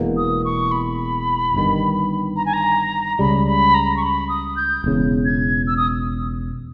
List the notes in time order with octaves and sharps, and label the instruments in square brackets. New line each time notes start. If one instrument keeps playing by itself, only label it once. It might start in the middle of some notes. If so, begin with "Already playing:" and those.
Already playing: [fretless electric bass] E1 E2 B2 A#3
[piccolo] D#6
C#6
B5
[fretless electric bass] G1 G2 D#3
[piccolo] A#5
G#5
A#5
[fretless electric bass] C#2 C#3 G3 [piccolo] B5
[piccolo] B5
A#5
C#6
B5
D#6
G6
[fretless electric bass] E1 E2 C#3
[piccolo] G#6
E6
D#6